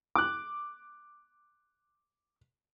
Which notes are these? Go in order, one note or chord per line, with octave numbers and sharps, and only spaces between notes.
D6 F#6